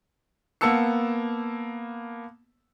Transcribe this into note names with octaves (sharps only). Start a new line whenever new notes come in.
A#3 B3 A5 E6 C#7